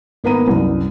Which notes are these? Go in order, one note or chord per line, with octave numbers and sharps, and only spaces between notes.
G#1 A#3 B3 B4 A#5 D#7
C2 F#2